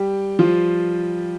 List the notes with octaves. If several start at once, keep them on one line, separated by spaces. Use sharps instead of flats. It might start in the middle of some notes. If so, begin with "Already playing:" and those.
Already playing: G3 G4
F3 F4